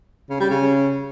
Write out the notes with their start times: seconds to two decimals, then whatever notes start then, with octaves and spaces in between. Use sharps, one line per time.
0.30 C#3
0.40 G3
0.50 C#3